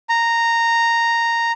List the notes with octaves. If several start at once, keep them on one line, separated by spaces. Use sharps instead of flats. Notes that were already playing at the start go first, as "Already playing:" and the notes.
A#5